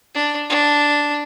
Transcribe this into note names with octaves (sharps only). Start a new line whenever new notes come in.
D4
D4